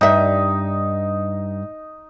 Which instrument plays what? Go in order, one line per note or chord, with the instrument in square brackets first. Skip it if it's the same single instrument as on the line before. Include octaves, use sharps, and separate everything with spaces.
[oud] G2 E5 [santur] D#4